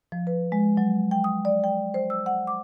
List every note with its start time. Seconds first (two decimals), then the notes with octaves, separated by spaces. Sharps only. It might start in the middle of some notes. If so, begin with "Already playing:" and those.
0.12 F3
0.27 B4
0.52 G#3
0.77 F#3
1.11 G5
1.24 D#6
1.45 D5
1.64 G5
1.94 C5
2.10 E6
2.26 F#5
2.47 D6